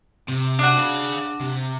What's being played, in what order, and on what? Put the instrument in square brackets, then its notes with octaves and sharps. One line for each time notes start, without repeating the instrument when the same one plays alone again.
[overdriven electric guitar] C3
[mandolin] D4 F#4
[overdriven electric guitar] G#4 F5
C3